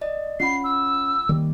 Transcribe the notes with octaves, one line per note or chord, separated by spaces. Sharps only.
D5 D#5
C#4 F4 F#5 B5 C7
E6
D#3 G3 A#3